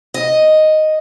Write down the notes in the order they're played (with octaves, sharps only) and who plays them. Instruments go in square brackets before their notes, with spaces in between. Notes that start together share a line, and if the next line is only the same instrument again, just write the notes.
[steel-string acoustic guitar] D#5